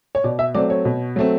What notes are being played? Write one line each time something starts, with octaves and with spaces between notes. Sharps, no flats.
C#5
B2 D5
E5
F#3 A3 C4 D5
C#5
B2
F#3 A3 C4